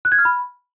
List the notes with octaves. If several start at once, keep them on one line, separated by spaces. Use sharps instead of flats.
F#6
G#6
F6
B5